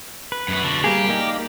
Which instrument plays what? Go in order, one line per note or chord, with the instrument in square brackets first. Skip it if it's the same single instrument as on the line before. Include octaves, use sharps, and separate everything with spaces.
[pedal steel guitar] B4
[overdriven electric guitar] F#2 B3
B2 D3
[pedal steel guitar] G3 A#3 G#4 [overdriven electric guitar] G4
[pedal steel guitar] A#3 D#4 D5